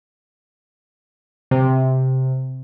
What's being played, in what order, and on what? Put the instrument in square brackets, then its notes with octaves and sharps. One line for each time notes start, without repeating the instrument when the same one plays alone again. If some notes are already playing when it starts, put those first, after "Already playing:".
[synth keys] C3